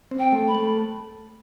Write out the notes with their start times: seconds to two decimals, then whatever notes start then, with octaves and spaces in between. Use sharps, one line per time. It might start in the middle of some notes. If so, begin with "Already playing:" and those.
0.11 C4
0.19 G5
0.32 A3
0.48 B5
0.55 A3